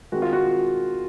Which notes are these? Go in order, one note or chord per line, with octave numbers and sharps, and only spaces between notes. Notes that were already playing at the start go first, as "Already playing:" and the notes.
D#3 G#3 C4 F#4
F4
F#4